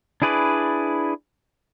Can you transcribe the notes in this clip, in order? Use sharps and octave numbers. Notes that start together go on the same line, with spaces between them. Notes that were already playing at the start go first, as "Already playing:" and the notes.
D4 E4 G#4 B4 D5